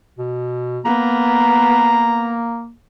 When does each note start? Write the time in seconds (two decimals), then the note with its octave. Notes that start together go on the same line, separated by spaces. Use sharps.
0.19 B2
0.85 A#3 B3 A#5